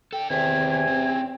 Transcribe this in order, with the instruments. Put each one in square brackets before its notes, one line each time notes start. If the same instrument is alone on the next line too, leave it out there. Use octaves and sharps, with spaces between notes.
[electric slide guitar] D4 A4 [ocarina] G5
[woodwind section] E2 C3 G#5 [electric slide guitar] D#3 C4 E5 [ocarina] G5
[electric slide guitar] C4 C#4